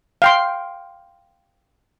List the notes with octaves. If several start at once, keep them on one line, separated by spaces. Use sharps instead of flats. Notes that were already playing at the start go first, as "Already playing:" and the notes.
F5 G5 C6